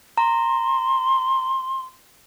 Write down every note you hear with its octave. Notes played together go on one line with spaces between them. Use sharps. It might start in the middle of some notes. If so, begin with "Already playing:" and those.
A#5 C6